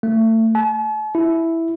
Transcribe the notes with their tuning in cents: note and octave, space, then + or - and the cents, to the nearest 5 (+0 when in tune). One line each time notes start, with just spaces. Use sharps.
A3 +30
A5 -45
E4 +0